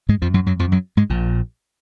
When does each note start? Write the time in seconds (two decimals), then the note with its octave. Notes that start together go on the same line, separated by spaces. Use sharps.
0.09 G#2 G#3
0.22 F2 F3
0.34 F#2 F#3
0.46 F#2 F#3
0.59 F2 F3
0.72 F#2 F#3
0.97 G#2 G#3
1.10 A#1 A#2